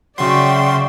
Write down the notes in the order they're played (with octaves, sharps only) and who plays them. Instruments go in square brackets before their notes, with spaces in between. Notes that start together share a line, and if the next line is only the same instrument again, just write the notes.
[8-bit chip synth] C#3 C6 [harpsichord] F#3 F#4 [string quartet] D5 E5 G5 [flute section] C#6